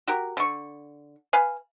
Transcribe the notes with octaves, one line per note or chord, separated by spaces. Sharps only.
F#4 G4 A#4
D3 C#6
B4 F5 G#5